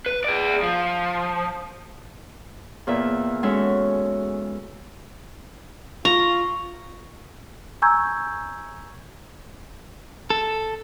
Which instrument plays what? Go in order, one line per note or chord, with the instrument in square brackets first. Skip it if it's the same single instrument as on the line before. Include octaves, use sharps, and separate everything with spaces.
[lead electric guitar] B4
G#4 D5
F3
[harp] E2 A#2 E5
G#3 C#4 F#4 A4 E5
[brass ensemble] F4 [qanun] A#5 [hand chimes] C#6
[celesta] G#5 A#5 C#6 E6 G6 G#6
[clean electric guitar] A4